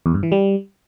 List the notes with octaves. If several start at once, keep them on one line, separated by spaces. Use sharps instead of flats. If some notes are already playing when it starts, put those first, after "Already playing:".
E2
G2
E3
G3